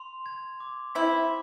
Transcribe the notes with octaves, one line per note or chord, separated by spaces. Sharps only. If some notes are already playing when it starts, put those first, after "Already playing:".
Already playing: C6 F7
G#6
D6
C4 E4 B6